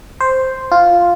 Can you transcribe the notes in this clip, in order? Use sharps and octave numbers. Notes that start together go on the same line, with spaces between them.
C5
F4